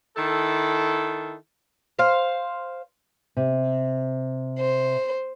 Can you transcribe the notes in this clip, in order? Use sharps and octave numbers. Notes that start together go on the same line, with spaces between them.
D#3 E4 A4
C5 F5
C3
C5